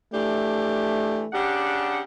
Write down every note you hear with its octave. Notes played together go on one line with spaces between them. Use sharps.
E3 A3 D4 G4
C#3 D4 G4 F#5